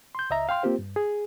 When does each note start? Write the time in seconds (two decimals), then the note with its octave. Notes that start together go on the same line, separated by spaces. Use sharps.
0.15 C6 G6
0.30 C#2 D#5 E5 A#5
0.49 F5 G5 C6 F6
0.63 A#3 C4 F4 G4 C5
0.79 G2
0.96 G#4